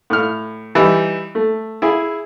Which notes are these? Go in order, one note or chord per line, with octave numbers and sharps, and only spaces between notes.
A2 F6
E3 G3 D#4
A3
E4 G#4 G#5